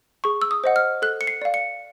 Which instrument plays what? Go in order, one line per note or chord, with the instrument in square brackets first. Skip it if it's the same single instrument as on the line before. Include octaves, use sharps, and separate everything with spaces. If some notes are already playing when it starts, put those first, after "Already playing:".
[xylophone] G#4 C#6
E6
D#6
C5 D#5 F#5
F6
A4 F#6
C#7
C7
D5 F5
C#7